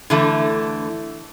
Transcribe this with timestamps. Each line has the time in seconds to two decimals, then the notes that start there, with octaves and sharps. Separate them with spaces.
0.10 D3 E3 A3